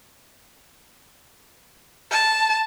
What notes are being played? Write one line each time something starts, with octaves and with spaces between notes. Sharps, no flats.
A5